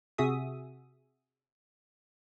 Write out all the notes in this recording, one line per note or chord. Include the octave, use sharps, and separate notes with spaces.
C3 F#4 G#4 E5 D#6